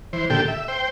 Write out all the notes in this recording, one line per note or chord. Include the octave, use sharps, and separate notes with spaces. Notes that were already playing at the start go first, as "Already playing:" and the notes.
E3 C5
A#2 D3 G4 A4 G5
E5
C5 G5